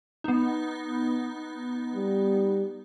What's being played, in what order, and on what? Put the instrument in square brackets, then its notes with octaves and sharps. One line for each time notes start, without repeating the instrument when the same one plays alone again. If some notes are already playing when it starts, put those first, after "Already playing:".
[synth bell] B3 D#4
[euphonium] G3